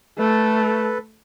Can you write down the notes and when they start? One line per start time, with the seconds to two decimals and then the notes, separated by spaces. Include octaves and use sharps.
0.19 A3 A4 B4